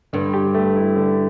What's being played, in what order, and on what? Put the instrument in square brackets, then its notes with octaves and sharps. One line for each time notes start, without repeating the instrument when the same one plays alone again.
[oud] G2 [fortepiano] D3
[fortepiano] G4
A3
E4
D3